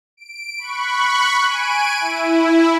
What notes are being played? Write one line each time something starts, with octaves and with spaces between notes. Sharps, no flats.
D7
B5 C#6 F#6
G#5 D7 D#7
E4